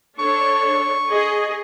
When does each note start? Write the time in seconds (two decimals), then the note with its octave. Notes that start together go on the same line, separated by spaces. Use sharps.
0.19 D4 A4 C#5 C#6
1.09 G#4 D#5